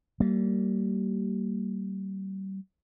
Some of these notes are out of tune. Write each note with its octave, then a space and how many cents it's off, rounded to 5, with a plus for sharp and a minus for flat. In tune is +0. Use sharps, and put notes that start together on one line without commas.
G3 -30 A#3 -25